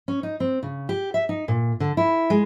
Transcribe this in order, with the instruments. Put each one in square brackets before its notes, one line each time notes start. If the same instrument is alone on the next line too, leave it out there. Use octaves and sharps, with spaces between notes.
[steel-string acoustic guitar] C#4
D#4
C4
C#3
G4
E5
D#4
A#2
D3
E4
G#3